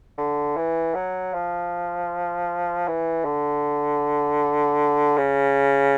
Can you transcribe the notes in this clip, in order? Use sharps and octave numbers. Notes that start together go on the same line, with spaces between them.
D3
E3
F#3
F3
E3
D3
C#3